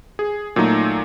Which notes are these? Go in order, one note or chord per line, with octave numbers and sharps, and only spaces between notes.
G#4
A#2 F#3 A3 D#4